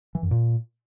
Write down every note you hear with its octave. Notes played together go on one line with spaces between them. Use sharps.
E3
F#2
A#2